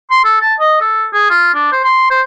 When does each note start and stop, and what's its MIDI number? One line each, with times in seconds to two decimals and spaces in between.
0.11 0.20 84
0.24 0.39 69
0.41 0.54 81
0.60 0.76 75
0.81 1.07 69
1.13 1.27 68
1.30 1.54 65
1.54 1.67 62
1.72 1.81 72
1.84 2.08 84
2.11 2.22 72